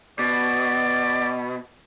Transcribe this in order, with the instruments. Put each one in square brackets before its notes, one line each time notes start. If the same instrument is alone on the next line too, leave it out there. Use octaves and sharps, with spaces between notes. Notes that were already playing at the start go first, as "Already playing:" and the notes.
[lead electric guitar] B2 [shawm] D5